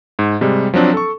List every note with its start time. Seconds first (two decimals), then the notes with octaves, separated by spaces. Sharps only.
0.19 G#2
0.41 C3 G3 G#3
0.74 F3 F#3 C4 D4
0.94 A4 C#6